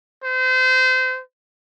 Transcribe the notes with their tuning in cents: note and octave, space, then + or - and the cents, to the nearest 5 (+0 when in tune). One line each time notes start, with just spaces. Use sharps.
C5 -30